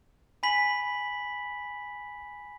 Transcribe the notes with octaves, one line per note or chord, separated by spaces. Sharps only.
G#5 B5 B6 F#7